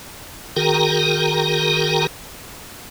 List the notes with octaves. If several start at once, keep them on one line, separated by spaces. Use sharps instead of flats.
D#3 F#4 G#4 A#4 G5 A#5